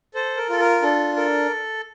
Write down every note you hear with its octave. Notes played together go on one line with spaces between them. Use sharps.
A4 C5
A#4
F4 A4
A#4
D4 A4
A4 A#4